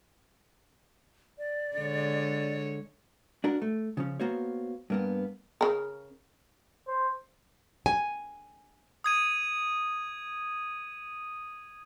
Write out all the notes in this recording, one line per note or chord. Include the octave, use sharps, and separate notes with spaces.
D5
D3 G#3 C#5
D4 F#4 A#4
A3
C#3 F3 C#4
A#3 B3 F#4 C5 C#5
G2 A#3 B3
C#3 A#4
C5
G#5
D#6 G#6 D#7